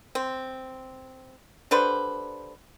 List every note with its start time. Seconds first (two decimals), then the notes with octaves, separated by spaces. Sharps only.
0.15 C4
1.71 D3 G3 B4 C5